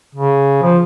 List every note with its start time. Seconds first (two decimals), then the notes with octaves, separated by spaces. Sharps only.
0.15 C#3
0.63 F3